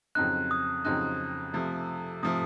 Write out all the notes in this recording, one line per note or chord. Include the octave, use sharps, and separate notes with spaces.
F2 C#3 F#3 C4 D#4 F#6
D#6
F2 C#3 F#3 C4 D#4 F#6
C3 F3 A3
C3 F3 A3 D#6